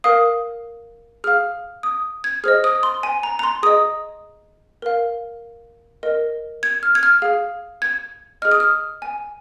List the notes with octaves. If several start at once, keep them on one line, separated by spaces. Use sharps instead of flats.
A#4 F5 D#6
G#4 F5 F6
D#6
G#6
G#4 C5 D#5 F6
D#6
C6
G#5
A#5
A#5
C6
G#4 D#5 D#6
A#4 F5
A#4 D#5
G#6
F6
G#6
F6
G#4 F5
G#6
G#4 D#5 F6
D#6
F6
G#5